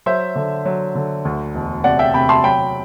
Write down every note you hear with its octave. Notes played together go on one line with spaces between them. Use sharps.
F#3 C5 E5
D3
F#3
D3
D2
E1
C3 D5 F#5
E5 G5
C3 G5 B5
A5 C6
F#3 G5 B5